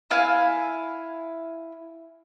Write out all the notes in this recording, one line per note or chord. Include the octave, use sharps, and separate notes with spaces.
E4 F5 G#5